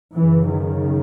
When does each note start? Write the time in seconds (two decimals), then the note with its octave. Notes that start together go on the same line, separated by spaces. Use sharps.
0.13 F#2 C#3 E3
0.50 D#3